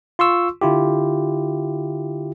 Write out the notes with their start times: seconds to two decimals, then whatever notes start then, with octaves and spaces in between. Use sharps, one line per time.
0.19 F4 C6 C#6 E6
0.61 D3 E4 F4 G4